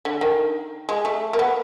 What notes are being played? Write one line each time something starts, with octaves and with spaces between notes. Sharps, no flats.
D3
D#3
G#3
A3
A#3
B3